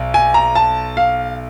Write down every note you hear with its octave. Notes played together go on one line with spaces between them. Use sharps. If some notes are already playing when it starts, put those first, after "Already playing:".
Already playing: B1
G#5
A#5
A5
F5